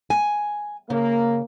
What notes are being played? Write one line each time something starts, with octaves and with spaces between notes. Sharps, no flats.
G#5
C#3 A#3